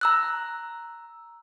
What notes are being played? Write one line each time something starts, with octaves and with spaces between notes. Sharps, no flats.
A#5 E6 F#6